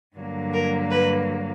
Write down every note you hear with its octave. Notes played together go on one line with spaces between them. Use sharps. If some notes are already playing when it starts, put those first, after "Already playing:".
G2 D3 F#3 A#3
A#4
B4